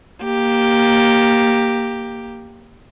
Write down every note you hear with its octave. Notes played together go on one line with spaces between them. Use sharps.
A#3 G4